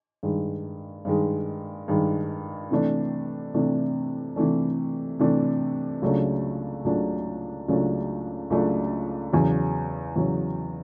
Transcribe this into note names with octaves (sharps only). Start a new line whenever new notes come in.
G2 D#3 G#3
G2 D#3 G#3
G2 D#3 G#3
C3 E3 A3 D4
C3 E3 A3 D4
C3 E3 A3 D4
C3 E3 A3 D4
C#2 C#3 F#3 A3 D4
C#2 C#3 F#3 A3 D4
C#2 C#3 F#3 A3 D4
C#2 C#3 F#3 A3 D4
E2 C#3 F#3
E2 C#3 F#3